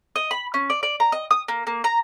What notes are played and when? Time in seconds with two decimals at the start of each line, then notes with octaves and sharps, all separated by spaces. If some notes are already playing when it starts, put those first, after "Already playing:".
0.16 D#5
0.31 B5
0.54 C#4
0.70 D5
0.83 D5
1.00 A#5
1.12 D#5
1.31 D#6
1.48 A#3
1.67 A#3
1.84 A#5